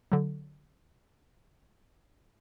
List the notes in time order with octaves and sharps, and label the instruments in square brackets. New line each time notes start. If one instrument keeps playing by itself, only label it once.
[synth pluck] D3 F#3